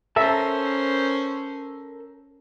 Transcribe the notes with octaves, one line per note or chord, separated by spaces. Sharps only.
C#4 A4 A#4 C5 E5 A5